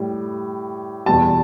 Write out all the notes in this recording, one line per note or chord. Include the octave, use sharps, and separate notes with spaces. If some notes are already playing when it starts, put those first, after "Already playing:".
Already playing: A2 G3
E2 B2 G3 A5